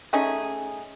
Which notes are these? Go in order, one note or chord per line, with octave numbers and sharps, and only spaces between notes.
A3 C#4 D#4 G#4